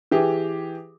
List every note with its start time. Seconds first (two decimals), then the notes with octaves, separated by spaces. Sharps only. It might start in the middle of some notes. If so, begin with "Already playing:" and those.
0.11 E3 G4 G#4